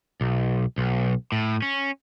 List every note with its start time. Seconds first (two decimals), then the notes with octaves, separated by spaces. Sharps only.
0.21 B1
0.78 B1
1.32 A2
1.62 C#4